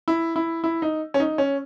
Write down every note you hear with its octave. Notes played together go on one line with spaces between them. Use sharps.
E4
E4
E4
D#4
C#4
D#4
C#4